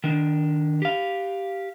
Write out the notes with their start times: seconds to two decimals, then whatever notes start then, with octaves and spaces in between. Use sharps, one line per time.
0.04 D#3 D4
0.82 G4 F5